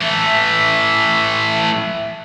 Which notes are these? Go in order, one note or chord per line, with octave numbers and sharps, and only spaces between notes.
E3 A3 E5